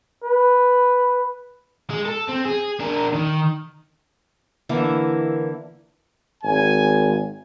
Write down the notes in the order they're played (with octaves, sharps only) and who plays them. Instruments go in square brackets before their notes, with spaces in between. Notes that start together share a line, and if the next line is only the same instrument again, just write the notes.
[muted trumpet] B4
[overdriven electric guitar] G#3 G#4
A4
C4
G#4
D4 A#4
D#3
[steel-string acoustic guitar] D3 E3 A#3 E4
[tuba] G#1 [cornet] G#5